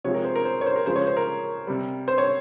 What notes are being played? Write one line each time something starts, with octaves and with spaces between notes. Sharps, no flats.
C3 F3 G#3 C#5
A#4
C5
A#4
C5
C#5
C5
A#4
C#3 F3 G#3 C5
C#5
C5
A#4
C3 G3
C5
C#5